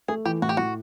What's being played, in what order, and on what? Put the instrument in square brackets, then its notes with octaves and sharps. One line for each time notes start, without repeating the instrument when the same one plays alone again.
[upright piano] A3 [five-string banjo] G#4
[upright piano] E3 [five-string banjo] G4
[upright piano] A2 [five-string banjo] F#4
[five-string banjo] G4
[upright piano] A2 [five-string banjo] F#4